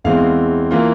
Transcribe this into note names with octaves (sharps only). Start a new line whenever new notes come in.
E2 E3 G#3 C4 F5
E3 A#3 F4